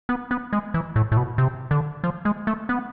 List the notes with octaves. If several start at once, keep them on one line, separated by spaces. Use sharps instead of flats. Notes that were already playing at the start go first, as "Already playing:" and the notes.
B3
B3
G#3
E3
A2
A2
B2
C3
D3
F3
G#3
A3
B3